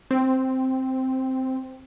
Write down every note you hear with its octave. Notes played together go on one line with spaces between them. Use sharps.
C4